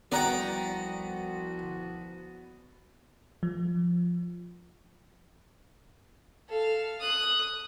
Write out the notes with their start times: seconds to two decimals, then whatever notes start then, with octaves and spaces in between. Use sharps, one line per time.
0.12 C2 F3 B3 F#4 D5 F#5 G5 A#5
3.43 F3
6.49 A4 F5
7.00 D#6 F#6